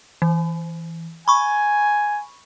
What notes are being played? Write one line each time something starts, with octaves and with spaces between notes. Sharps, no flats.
E3
G#5 B5 C#6